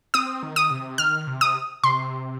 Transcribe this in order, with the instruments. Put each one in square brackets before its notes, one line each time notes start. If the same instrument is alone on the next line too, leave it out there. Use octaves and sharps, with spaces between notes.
[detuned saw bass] C4 [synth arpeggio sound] D#6
[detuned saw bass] D#3
[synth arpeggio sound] D#6
[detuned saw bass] C3
[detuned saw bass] D#3 [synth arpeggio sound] F6
[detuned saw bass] C3
[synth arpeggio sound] D#6
[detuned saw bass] C3 [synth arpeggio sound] C6